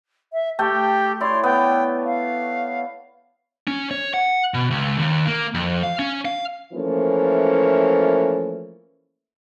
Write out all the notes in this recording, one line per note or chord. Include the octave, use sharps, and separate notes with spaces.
E5
A3 G4 A4 G5
E4 C#5 D5 C6
B3 G5
F5
C#4
C#5
F#5
B2
C#2
D#2
A#3
F2
F5
C#4
F5
E3 F3 A3 A#3 C#4